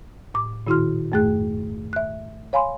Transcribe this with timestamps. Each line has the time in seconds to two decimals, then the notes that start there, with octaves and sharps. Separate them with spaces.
0.34 A2 D6
0.67 A#2 D#3 E4 F#4 C6 F6
1.12 F2 G#2 A3 G#4 F#6
1.93 E5 F#6
2.53 C#5 F5 G#5 B5 C6